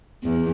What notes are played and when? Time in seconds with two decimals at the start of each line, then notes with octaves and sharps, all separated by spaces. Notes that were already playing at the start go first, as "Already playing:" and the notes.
0.23 E2